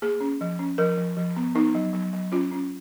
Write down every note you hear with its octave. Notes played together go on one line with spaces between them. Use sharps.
A#3 G#4
C#4
F3
C#4
F3 A#4
F3
F3
B3
B3 D#4
F#3
F#3
F#3
C#4 F4
C#4